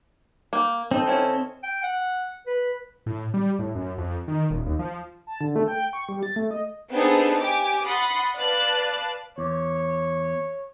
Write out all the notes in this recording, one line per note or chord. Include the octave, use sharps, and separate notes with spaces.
A#3 G5
C4 D#4 A4
D#3 C#4 E4
G5
F#5
B4
A2
G3
A2
F#2
F2
D#3
D#1
D#2
F3
A5
D3
A3
G5
C#6
G3
A6
A3
D#5
B3 C4 D4 D#4 G#4 A4
G4 G#5 D6
F#5 B5 C6 D#6 A6
B4 D5 F5 A5 F#6 A6
E2 C#5